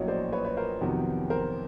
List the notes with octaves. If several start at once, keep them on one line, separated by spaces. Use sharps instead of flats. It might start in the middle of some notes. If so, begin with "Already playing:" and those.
Already playing: A#1 A2 F#3 A#3 C#4 C#5 D#5
C5 D5
B4 C#5
B4 C#5
A#4 C5
F2 C3 D#3 F#3 B3
A#4 C5